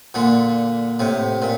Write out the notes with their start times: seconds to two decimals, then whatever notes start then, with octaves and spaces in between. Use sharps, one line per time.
0.14 A#2 D3
0.99 A2 C3
1.42 A#2